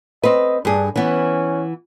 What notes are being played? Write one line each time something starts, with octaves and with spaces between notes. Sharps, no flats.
C4 B4 D#5
G2 D4 G#4
E3 B3 C#4